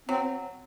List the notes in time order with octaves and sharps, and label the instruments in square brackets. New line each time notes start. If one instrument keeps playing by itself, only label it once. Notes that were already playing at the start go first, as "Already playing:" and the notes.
[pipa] F#3 [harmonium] C4